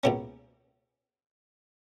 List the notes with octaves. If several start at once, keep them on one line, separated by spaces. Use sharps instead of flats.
C#2 B2 A#3 C#4